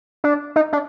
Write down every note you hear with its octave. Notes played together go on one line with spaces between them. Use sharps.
D4
D#4
D4